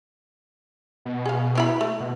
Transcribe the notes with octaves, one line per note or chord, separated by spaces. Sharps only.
B2
G#4 F5
C4 E4 B5
A3
B2